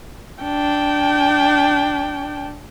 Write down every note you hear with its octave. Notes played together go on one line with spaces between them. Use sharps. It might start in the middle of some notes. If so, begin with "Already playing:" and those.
D4 G5